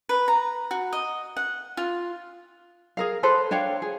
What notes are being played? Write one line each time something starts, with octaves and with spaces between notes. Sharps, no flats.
B4
A#5
F#4
D#5
F#5
F4
G#4 A#4 F5
A4 B4 C5
D4 C#5 F5 G5
G#4